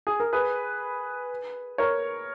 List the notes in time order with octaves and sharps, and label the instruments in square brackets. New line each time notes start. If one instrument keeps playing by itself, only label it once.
[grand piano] G#4
A#4
G#4 B4
A#4 C#5